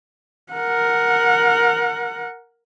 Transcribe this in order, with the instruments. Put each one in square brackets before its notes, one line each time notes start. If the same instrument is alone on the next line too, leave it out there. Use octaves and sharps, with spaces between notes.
[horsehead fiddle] A#4 F#5